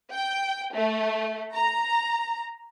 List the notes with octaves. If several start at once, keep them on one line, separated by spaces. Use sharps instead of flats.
G5
A3
A#5